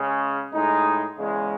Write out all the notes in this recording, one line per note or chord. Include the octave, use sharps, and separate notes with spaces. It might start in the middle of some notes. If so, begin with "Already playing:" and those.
Already playing: C#3 G#3 C#4 G#4
A2 G#3 D#4
E2 C#3 G#3